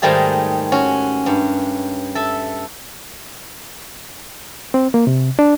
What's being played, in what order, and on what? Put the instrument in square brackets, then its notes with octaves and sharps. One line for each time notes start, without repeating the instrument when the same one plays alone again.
[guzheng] G#2 D#3 G3 A3 G#4
C#4 F#4
G2
A4 E5
[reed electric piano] C4
A#3
C3
D4